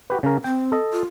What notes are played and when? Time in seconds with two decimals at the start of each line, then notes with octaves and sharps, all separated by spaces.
0.10 F#4 G4 B4
0.23 C#3 C#4 A#4
0.44 C4 G5
0.72 A4 D#5
0.93 F4